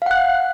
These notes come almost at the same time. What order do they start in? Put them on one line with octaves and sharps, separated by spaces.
F5 F#5 F#6